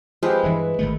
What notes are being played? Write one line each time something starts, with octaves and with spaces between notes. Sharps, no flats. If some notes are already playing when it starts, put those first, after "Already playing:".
F3 G#3 C4 G4 B4
G2 E3 E4
G#1 D#3 A3